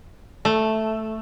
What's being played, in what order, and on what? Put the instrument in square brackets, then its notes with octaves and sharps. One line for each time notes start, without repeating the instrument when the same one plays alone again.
[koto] A3